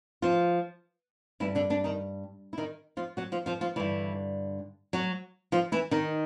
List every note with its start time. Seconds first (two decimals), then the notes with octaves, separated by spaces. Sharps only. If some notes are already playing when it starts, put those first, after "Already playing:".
0.22 F3 F4
1.40 G2 D3 E3 E4
1.55 D3 D4
1.70 D3 D4
1.84 D#3 D#4
2.53 E4
2.58 D#3 D#4
2.97 F3 F4
3.17 F#3 F#4
3.32 F3 F4
3.46 F3 F4
3.61 F3 F4
3.76 G2 D3 E3 E4
4.93 F#3 F#4
5.52 F3 F4
5.72 E3 E4
5.91 D#3 D#4